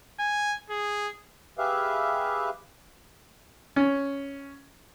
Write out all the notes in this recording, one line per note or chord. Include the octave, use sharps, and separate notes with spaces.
G#5
G#4
G4 G#4 B4 E5 F5
C#4